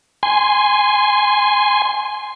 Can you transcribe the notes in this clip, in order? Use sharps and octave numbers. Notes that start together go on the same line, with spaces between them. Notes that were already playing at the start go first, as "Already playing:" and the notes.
G#5 C6